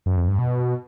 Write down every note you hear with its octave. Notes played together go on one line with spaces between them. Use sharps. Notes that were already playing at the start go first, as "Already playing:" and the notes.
F#2
F2
G2
B2